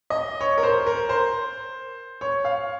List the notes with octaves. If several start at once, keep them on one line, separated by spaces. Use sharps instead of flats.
D#5
C#5
A#4
C5
A#4
C5
C#5
F5